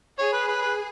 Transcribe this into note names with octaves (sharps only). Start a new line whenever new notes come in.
G#4 C#5
B4
B4
B4